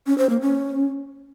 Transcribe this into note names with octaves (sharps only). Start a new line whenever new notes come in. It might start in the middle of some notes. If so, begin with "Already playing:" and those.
C#4
C5
A#3
C#4